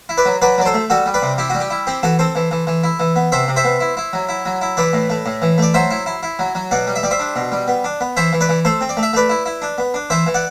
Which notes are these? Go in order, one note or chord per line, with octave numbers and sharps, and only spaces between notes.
E4
B4 D5
F#3
F#3 B4 D5
F#3 D5
A4 C5
A3
G3 F#4 A4
G3
B4 D5
C3
E4 G4
G3 F#4
G4
E4
C4 G4
E3 F#4 A4
C4 A4 C5
E3
E3
E3
E4
E3
B3
C3 C5 E5
C3
C5 E5
B3
E4
E4
F#3
E4
F#3
E4
E3 B4 D5
A2
A3
A2
E3
A3 D5
F#3 C5 E5
E4
E4
E4
F#3
F#3
B2 D5 F#5
G3
E5
G3 D5
C5 E5
D4
B2
G3
B3
D4
B3
E3 C5 E5
E3
B4 D5
E3
A3 A4 C5
C4
D5
A3
E5
A3 B4 D5
E4
E4
D4
B3
D4
E3 C5 E5
E3
D5 F#5